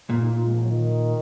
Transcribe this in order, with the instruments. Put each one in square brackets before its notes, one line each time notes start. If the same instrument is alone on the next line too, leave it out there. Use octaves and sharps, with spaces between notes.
[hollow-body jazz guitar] A#2 [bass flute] A#3
[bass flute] D#4
F4
G#3
F3
F#3
D#3